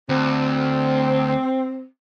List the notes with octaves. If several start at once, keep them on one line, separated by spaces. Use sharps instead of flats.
D2 C4